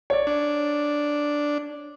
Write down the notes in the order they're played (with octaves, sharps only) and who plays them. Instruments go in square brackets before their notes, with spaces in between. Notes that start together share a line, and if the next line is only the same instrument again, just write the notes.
[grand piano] C#5 D5
[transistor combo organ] D4